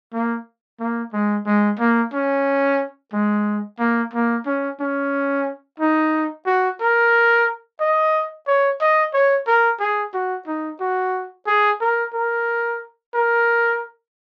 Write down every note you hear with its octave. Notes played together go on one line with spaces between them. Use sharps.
A#3
A#3
G#3
G#3
A#3
C#4
G#3
A#3
A#3
C#4
C#4
D#4
F#4
A#4
D#5
C#5
D#5
C#5
A#4
G#4
F#4
D#4
F#4
G#4
A#4
A#4
A#4